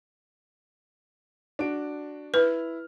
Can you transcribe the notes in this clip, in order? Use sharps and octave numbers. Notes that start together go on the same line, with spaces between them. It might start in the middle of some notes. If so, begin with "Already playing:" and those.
D4 F#4 D7
E4 B4 F6